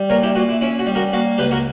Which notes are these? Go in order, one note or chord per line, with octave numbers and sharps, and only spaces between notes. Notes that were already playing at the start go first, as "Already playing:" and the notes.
Already playing: G3
A#2 A#4 C#5
E4 G4
A#2 F#4
E4
C#4 E4
F#4
G3
F#4 A#4
A#3 F#4
C#2 G4 B4
F#4 A#4